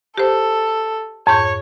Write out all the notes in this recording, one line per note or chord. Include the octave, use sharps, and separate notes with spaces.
G4 A4 C5
F2 G#2 C#5 G6